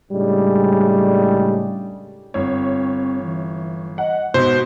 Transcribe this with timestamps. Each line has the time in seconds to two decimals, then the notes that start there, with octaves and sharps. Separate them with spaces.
0.12 A2 C#3 G3 G#3 D4 G#4
2.34 G1 C4 C#5
3.23 E3
3.98 D#5 F#5
4.34 G#2 B2 B3 C5